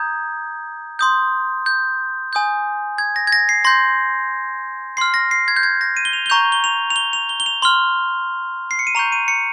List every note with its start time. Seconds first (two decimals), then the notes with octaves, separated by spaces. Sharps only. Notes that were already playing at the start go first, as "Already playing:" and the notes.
Already playing: A#5 D#6 G6 G#6
0.99 C6 D#6 G6
1.66 G6
2.33 G#5 D#6 G6
2.98 G#6
3.16 A#6
3.27 G#6
3.32 A#6
3.49 C7
3.64 C6 G6 A#6
4.97 C6 F6 C7
5.14 A#6
5.31 C7
5.48 G#6
5.56 G6
5.63 G#6
5.81 A#6
5.97 D#7
6.05 G7
6.13 F7
6.26 G7
6.30 A#5 C#6 G6 F7
6.52 G7
6.64 F7
6.90 F7
6.96 G7
7.13 F7
7.29 G7
7.40 G7
7.46 F7
7.62 C6 F6 G7
8.71 C7
8.79 C#7
8.87 D#7
8.95 A#5 C#6 G6 F7
9.12 D#7
9.28 C#7